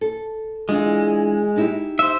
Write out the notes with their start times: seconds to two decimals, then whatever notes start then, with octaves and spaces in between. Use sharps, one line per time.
0.01 A4
0.69 E3 G#3 D4 F4
1.56 D#4 E4 G4
1.99 C5 E5